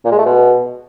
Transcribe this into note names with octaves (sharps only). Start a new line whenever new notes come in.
A#2
G#3
A3
B2